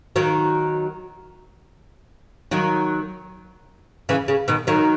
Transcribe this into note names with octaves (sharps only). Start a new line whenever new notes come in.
D#3 F#3
D#3 F#3
C#3 E3
C#3
B2 D#3
D#3 F#3